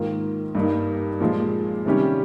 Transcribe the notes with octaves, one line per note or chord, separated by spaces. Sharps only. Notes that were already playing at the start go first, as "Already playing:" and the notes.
Already playing: G#2 D#3 A#3 F4
G2 G3 A#3 D#4
A#2 F3 G#3
C3 D#3 G3 C#4 G4